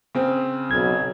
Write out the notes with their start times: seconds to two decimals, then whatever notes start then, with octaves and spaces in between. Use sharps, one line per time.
0.15 C#3 C4
0.71 B1 G#6